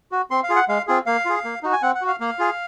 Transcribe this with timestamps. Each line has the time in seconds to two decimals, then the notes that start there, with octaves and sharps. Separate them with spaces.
0.12 F#4
0.31 C4 C6
0.43 F5
0.49 F4 G#4
0.56 F#5
0.68 G#3 F5
0.87 C4 F4 G#4
1.06 A#3 F5
1.25 F4 G#4
1.44 A#3
1.63 D#4 F#4
1.73 G#5
1.82 C4 F#5
1.95 F#5
2.01 F#4
2.08 F5
2.20 A#3 F5
2.39 F4 G#4